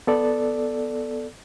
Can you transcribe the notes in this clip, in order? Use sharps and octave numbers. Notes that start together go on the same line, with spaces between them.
B3 A4 D5